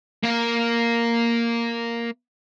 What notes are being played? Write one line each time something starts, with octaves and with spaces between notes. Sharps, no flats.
A#3 F5